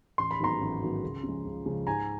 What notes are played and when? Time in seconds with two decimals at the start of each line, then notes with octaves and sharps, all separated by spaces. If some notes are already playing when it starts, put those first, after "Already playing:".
0.18 A1 C6
0.31 B5
0.40 G#2 D#3 F#3 B3 A#5 C6
0.61 A1
0.81 G#2 D#3 F#3 B3
1.03 C#2
1.23 C#3 F3 G#3
1.45 C#2
1.66 C#3 F3 G#3
1.87 G#2 G#5 A#5